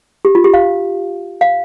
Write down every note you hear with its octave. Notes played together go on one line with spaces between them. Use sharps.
G4
F4
G4
F5
F5